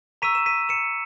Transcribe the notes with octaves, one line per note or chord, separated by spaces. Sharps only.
A#5 C#6 E6 B6 D#7
E7
B6 D#7
C#7 E7